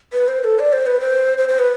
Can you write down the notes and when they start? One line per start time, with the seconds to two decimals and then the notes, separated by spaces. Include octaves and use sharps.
0.13 B4
0.28 C5
0.44 A4
0.59 D5
0.73 C5
0.86 B4
1.00 C5
1.38 C5
1.49 C5
1.59 B4